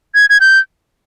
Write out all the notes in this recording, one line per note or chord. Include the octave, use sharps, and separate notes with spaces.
G#6
G#6
G6